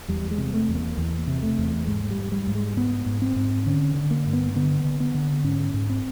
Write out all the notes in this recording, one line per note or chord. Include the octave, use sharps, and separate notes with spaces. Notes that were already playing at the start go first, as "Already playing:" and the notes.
E2 G3
G#3
C3
A3
E2
A#3
E2
C3
A3
E2
G#2 G#3
G3
G#2
G3
G#2
G#3
G#2 B3
G#2
C4
G#2
D3 C#4
D3
A#3
G2
B3
D3 B3
D3
B3
D3
G#2 C#4
G#2
C4